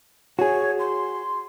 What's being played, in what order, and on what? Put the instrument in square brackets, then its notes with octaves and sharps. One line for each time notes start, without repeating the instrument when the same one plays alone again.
[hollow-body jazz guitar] F#4 G#4 [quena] C#5
[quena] C6